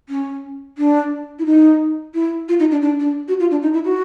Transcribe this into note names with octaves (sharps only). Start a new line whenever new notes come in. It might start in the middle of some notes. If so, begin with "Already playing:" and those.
C#4
D4
E4
D#4
E4
F4
D#4
D4
D4
D4
F#4
F4
D4
D#4
E4
F#4